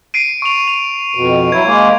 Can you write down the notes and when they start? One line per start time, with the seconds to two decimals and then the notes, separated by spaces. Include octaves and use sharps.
0.14 C7 D7 D#7
0.42 C#6 F7
0.68 F7
1.15 F2 B2
1.52 F#3 E4 G#6
1.65 G#3 A#3